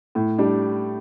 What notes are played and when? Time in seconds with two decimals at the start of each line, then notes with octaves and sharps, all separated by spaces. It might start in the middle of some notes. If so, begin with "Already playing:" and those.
0.15 A2
0.38 G3 D4